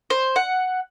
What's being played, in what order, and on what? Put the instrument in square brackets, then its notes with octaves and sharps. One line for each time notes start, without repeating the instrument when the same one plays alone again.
[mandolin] C5
F#5